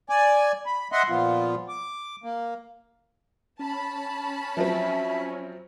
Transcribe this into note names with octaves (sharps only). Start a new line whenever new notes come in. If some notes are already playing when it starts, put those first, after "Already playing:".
D5 G#5
B5
D#5 E5 F#5 C6
A#2 F3 B3 F4
D6
A#3
C#4 A5 B5
F3 F#3 C4 E5